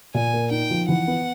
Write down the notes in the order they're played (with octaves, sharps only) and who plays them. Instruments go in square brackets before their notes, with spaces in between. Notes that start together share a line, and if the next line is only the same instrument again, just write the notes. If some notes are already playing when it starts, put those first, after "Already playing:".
[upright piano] A#2 [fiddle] G#5
[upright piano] A#3
[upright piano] D#4 [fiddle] G5
[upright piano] F3
[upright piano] E3 [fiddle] F#5
[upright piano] B3